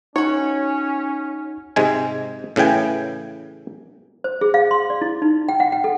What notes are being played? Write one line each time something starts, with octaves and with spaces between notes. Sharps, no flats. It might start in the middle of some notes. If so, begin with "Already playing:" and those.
C#4 D#4 F#4 C#5
G#2 C3 G#3 G#5
A2 C#3 E3 G5 G#5
C5
G#4
F5
C6
D5
E4
D#4
G5
F#5
G5
A4